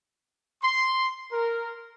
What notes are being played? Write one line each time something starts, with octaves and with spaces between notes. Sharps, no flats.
C6
A#4